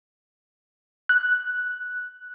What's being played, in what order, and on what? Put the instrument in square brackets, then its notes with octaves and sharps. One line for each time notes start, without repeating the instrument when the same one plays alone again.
[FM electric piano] F#6